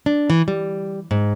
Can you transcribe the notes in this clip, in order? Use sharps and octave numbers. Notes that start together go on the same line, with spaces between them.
D4
E3
G3
G#2